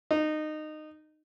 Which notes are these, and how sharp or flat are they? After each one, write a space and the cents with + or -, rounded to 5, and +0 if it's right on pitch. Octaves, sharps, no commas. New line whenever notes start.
D#4 -20